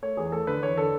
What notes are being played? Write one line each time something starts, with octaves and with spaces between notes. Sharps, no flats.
A3 C#5
E2 G#4
A3 A4
D3 B4
E2 C#5
D3 A4